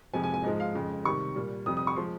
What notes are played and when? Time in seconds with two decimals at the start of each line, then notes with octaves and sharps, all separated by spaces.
0.13 F2 C3 F3 G#3 G#5
0.24 G#5
0.34 G#5
0.44 G#2 F3 G#3 D#5
0.60 F5
0.75 F2 C#3 G#3
1.05 C3 D#3 G3 C#6
1.36 A#2 G3
1.66 F2 C3 G3 D#6
1.77 D#6
1.87 C#6
1.96 F3 G#3 C6